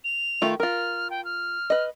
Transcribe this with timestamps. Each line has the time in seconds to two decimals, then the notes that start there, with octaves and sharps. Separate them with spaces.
0.04 F7
0.42 D#3 A3 F4
0.60 F4 A#4 F6
1.10 G5
1.25 F6
1.70 B4 D#5